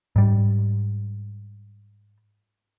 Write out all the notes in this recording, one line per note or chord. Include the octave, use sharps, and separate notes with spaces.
G#2 G3